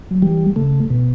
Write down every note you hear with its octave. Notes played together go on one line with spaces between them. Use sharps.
F#3
E3 G3
C#3 A3
B2